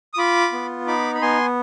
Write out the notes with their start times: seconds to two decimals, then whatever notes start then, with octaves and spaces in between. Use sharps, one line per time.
0.14 D#6
0.17 F4 B5 D6
0.52 B3
0.87 D#4 B5 D6
1.15 B5
1.21 B3 G#5 C6